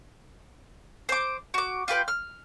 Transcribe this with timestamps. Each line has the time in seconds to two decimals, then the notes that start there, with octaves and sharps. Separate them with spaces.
1.09 C5 D6
1.54 F#4 D6
1.88 F4 G4 B4 G5
2.08 F6